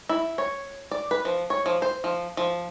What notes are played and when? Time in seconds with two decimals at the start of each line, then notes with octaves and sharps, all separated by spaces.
0.09 E4
0.38 C#5
0.92 D5
1.11 B4
1.25 F3
1.50 C#5
1.66 F3
1.82 C5
2.04 F3
2.37 F3